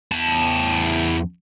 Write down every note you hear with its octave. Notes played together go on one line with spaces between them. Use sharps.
E2 A5